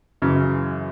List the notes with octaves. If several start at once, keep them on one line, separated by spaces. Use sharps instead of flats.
F#2 C#3 E3